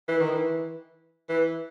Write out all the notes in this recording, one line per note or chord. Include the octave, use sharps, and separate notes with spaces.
E3
D#3
E3
E3